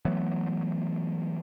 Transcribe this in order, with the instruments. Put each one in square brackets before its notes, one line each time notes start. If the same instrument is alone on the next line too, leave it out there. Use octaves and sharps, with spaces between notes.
[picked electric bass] E3 F#3 A3 B3